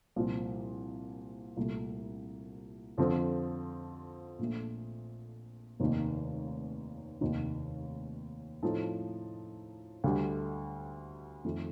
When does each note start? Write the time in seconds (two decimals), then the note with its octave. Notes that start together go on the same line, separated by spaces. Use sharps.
0.16 C2 A#2 F3 C4
1.57 C2 A#2 A3
2.98 F2 D3 F3 C4
4.39 A#1 A#2 A3
5.80 F1 D#2 D#3 A#3
7.21 F1 D#2 D#3
8.63 A2 F3 C4 D#4 A4
10.04 D2 D3 G3
11.45 F2 D#3 A3